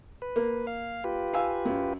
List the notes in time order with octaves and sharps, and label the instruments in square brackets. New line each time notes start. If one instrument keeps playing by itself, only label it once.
[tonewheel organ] B4
[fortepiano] A#3
[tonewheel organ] F5
F4 G4 B4
[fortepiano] F5 G#5 E6
F#2